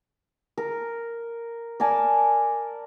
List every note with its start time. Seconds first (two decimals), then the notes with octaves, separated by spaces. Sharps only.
0.58 A#4
1.80 A#4 D5 G#5 A5